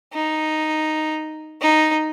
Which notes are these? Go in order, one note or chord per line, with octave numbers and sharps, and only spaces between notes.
D#4
D#4